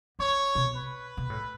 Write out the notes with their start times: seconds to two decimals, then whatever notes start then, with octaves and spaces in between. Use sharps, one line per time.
0.19 F#2 C#5
0.55 B2
0.75 B4
1.17 B2
1.30 A2